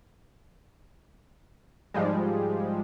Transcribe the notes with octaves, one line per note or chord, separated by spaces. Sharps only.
G#2 F3 G3 G#3